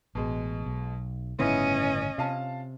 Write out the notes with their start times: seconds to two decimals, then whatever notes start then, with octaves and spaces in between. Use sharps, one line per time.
0.15 A1 B2 G#3
0.66 B1
1.39 G1 A2 C#3 B3 C#4 D#4 E4 D#5
2.18 C3 F4 F5 A5